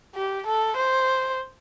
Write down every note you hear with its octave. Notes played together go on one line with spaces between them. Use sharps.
G4
A4
C5